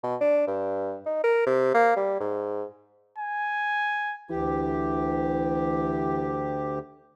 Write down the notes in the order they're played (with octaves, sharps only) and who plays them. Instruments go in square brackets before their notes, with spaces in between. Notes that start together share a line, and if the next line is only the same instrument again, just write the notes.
[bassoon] B2
D4
G2
D#4
A#4
C3
A#3
G3
G#2
[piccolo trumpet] G#5
[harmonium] D2 G4 [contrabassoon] E3